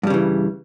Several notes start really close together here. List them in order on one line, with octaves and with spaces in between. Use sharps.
G2 G3 C#3 E3